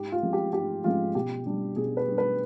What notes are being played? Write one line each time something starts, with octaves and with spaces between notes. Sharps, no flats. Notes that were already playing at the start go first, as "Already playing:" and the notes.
Already playing: G#2 G4
F4
F3 G#3 C4
G4
G#2 G4
F3 G#3 C4 F4
B2 G4
G3 D4
B2 G#4
B4
G3 D4
B4